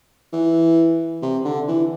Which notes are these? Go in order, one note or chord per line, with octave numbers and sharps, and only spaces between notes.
E3
C3
D3
E3